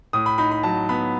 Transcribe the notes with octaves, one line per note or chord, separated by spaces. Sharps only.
A2 D#6
B5
D#4 B5
B5
F#3 A5
B3 B5